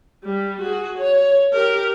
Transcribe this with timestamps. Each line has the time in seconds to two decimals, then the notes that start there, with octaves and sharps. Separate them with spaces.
0.25 G3
0.62 F#4 G#4
0.98 C#5
1.53 G4 A#4